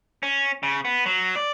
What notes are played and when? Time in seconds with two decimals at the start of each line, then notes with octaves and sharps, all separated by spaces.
0.23 C#4
0.63 C#3
0.85 B3
1.06 F#3
1.35 D5